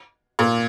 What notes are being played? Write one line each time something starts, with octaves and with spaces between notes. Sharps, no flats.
A#2